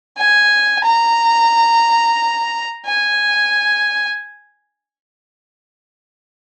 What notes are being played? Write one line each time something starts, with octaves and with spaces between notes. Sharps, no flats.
G#5
A#5
G#5